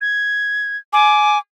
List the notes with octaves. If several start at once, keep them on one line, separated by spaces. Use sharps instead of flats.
G#6
G#5 D6